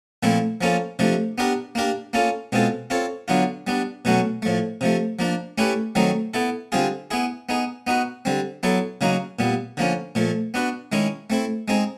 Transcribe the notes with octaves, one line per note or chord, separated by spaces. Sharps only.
A#2 F3 A3 C4 E4
F3 A#3 C#4 F4 A4
C3 F3 A3 D4
B3 D4 G4 A#4
A#3 D4 G4 A#4
A#3 C#4 F4 A4
B2 G#3 C4 F4 A4
C4 F4 A4 C#5
D3 F#3 B3 D4 F4
G3 B3 D4
B2 F#3 A3 C#4 F#4
A2 F3 A3
C3 F3 A3
F3 A#3 D4
A3 C#4 E4 G4 B4
D#3 F#3 A3 C4 D#4
B3 E4 A4
D3 G3 C4 F4 G#4
B3 E4 G#4
B3 D#4 G#4
B3 D#4 F#4 B4
D3 G3 C4
F#3 B3 E4 A4
C#3 F#3 A#3 D#4 F#4
A#2 G3 B3
D3 F3 A#3 C#4
A#2 F3 A3
B3 D4 F#4 B4
D#3 G#3 C#4 E4
A3 C4 E4
G#3 C4 D#4 G#4